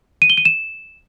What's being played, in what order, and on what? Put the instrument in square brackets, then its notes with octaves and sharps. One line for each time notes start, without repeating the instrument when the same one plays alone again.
[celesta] D#7
G7
D#7
E7